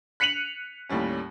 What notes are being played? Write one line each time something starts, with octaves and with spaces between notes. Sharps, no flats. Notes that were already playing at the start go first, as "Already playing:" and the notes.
F#6 B6 C#7 D#7 F7 F#7
D#2 A2 G3 C#4